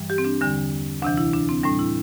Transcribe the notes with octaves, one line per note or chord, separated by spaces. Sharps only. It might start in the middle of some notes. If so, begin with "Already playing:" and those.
Already playing: G2 E3 G3
G4
C4
D4
E2 D3 G3
D2 C3 E3 D4
E4
D4
C4
A2 G3 D4
E4